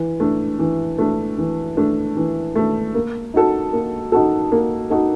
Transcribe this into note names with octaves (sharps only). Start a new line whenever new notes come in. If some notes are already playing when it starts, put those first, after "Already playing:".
Already playing: E3
A3 D4
E3
A3 D4
E3
A3 D4
E3
A3 D4
A#3
D#4 F#4 A4
A#3
D#4 F#4 A4
A#3
D#4 F#4 A4